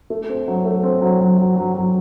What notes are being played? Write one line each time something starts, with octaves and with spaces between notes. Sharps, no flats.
A3
C4
F#3
A3
C4
F#3
F#3
F#3
F#3
F#3